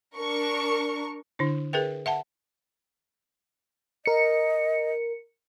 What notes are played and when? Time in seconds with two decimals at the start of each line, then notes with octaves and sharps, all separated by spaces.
0.16 D4 A#4 C#6
1.39 D3 D4 E4
1.73 G#4 A#4 B4 E5 G5
2.06 E5 F#5 A5
4.06 A#4 D#5 C#7